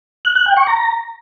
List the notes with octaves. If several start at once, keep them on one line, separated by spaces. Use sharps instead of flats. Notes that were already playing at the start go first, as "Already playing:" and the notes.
F#6
F#6
G5
C#6
A#5